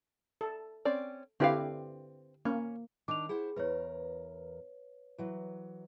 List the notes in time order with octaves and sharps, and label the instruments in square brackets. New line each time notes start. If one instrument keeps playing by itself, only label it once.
[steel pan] A4
[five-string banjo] C4 C#4 D5
[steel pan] D3 E4 G4 [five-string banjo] C4 B4 F5
[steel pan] A#3 [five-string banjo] C#4
[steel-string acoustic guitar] D#3 D4 [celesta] D6 F7
[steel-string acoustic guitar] E4 C5 F#5 [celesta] G#4
[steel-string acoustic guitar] E2 A#4 [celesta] B4 C#5
[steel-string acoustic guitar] E3 F#3